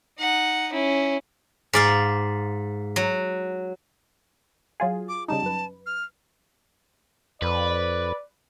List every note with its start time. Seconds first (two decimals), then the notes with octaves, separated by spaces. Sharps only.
0.19 D#4 F#5
0.73 C#4 E4
1.73 G#2 D5 F5
2.96 F#3
4.80 F#3 F4 G#4
5.09 D6
5.28 C#3 G3 D#4 A5
5.42 F#2 B4
5.86 F6
7.42 F2 B4 D5